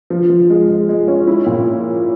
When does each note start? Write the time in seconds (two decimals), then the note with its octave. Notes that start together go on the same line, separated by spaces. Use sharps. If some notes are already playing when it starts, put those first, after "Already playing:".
0.10 F3
0.30 F3
0.50 G#3
0.69 G#3
0.89 G#3
1.08 C#4
1.27 E4
1.46 A#2